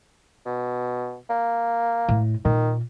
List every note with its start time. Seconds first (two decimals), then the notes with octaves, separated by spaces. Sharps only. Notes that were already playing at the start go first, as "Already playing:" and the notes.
0.46 B2
1.29 A#3
2.08 A2
2.45 A#2 D#3